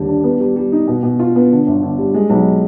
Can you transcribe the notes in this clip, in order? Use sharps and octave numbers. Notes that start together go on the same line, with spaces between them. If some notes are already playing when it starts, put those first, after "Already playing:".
Already playing: D#2 D3 G3
D4
B3
G3
G3
D#4
B2
B2
F4
B3
D3
G1
D3
G3
G#3
B1